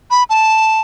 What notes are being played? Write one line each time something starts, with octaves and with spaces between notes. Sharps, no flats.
B5
A5